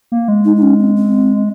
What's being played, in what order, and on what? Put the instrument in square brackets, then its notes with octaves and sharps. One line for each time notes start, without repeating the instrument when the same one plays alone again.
[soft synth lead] A#3
G#3
[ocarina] D#4
D#4
C#4
C4
C4